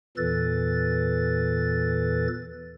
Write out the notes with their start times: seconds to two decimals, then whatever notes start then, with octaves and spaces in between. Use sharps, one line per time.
0.17 E2 A#2 E3 A4 B4 A6